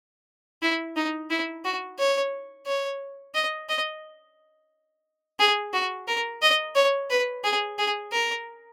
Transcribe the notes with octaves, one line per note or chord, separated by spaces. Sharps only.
E4
D#4
E4
F#4
C#5
C#5
D#5
D#5
G#4
F#4
A#4
D#5
C#5
B4
G#4
G#4
A#4